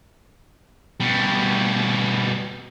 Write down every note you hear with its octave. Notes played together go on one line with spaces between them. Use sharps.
B2 G3